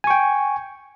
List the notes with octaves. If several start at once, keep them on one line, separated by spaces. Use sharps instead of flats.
G5 G#5 C#6